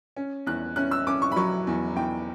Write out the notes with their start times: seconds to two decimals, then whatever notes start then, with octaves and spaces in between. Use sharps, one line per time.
0.16 C#4
0.46 E2 F#6
0.76 C#4 F#6
0.91 E6
1.07 C#4 D6
1.22 C#6
1.32 B5
1.36 F#3 C#6
1.67 E2
1.96 E2 G5